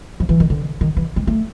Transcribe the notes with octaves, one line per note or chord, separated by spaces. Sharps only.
F3
E3
D#3
D3
D#3
E3
G#3
A3